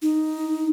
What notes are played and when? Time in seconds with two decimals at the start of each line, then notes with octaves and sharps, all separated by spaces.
0.02 D#4